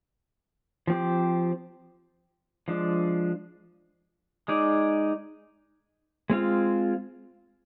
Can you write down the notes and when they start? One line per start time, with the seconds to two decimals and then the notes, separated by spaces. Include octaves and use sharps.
0.87 F3 C4 G4
2.68 F3 G#3 D4
4.48 G#3 D#4 G#4 D5
6.30 G#3 C4 F4